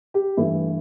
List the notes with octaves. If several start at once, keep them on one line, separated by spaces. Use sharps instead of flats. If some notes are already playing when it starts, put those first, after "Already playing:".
G4
G2 E3 A3 E4